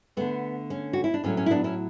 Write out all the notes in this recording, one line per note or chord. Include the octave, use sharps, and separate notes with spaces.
D3 A3 B3
C#4
F#4
E4
D4
A2 F#3 A3 C#4
C#4
E4
B3 D4
C#4 E4